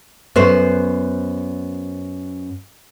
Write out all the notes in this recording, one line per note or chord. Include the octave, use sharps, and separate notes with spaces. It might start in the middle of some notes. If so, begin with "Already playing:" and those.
F#2 B3 C5